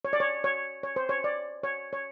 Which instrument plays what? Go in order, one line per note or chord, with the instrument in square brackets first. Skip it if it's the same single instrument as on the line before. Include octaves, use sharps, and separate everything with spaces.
[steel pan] C#5
D5
C#5
C#5
C#5
C5
C#5
D5
C#5
C#5